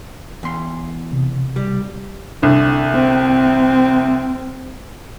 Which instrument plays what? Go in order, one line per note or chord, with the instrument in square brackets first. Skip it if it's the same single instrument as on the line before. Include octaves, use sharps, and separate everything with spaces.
[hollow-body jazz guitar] E2 C6
[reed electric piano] C3
[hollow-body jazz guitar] G3
[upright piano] C2 D3
[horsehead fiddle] C4